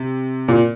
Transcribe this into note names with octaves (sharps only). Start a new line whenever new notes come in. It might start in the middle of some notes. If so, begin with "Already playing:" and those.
Already playing: C3
A#2